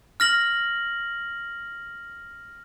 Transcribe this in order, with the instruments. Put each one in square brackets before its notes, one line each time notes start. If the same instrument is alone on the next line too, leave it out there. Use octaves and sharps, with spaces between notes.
[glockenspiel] F6 A#6 F#7